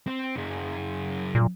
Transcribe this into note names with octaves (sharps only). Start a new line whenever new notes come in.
C4
F#2 G#4
A#2